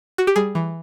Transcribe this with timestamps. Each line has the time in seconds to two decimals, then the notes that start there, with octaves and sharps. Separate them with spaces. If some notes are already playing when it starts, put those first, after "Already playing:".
0.18 F#4
0.27 G4
0.36 G3 G#4
0.55 E3